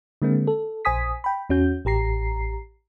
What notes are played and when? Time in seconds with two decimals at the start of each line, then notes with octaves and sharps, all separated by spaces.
0.22 D3 G#3 A#3 C4
0.47 A4
0.85 A#1 C5 G#5 D#6 B6
1.24 G5 B5
1.50 E2 C#4 F#4 G6
1.85 A1 G4 A#5 C7